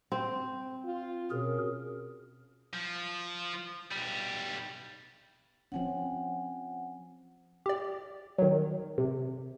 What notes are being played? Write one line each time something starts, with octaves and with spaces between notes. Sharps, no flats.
C4
F4
B2 C#4 G#4 A#4
F3
B1 G3
F3 C4 C#4 F#5 G#5
G4 D5
D#3 F#3
C3